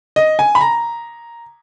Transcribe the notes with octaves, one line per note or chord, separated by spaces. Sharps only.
D#5
G#5
B5
A#5